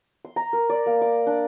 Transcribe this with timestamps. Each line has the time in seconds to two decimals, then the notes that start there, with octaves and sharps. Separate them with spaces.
0.25 C6
0.36 A#5
0.53 A#4
0.70 D5
0.86 A#3
1.02 D6
1.27 D4